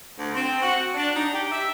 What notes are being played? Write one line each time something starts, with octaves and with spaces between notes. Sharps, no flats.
D2
C4
F#4
D4
D#4
G4
E5